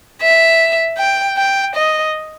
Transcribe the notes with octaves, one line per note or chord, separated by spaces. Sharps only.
E5
G5
G5
D#5